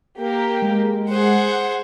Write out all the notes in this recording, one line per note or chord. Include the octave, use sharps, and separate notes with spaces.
A#3 G4 A#4
G#3
G#4 C5 F#5